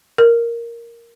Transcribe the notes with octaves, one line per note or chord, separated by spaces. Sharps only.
A#4